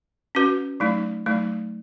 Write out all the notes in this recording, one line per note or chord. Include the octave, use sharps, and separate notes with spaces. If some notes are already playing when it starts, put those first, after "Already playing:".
C#4 F#4 B4
F#3 A3 D#4
F#3 A3 D#4